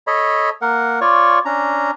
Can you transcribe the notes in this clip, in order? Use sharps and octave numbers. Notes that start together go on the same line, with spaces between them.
A4 C#5 D#5 B5
A#3 A#4 F#5
F4 C#5 D5 C#6
C#4 D4 A#5